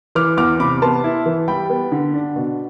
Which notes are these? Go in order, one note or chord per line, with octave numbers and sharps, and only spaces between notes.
E3 D6 F6
E2 D6 F6
C3 B5 D6
B3 A5 C6
E4
E3
G3 G5 B5
B3
D3
D4
B2